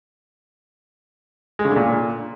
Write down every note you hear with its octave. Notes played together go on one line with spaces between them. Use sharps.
G#3
C#3
D3
A#2